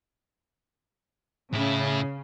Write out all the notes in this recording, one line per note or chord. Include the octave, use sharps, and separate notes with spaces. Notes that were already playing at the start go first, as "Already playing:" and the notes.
A2 C#3 E4